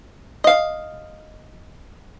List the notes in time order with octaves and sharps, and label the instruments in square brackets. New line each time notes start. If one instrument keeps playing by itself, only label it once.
[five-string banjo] D#5 F5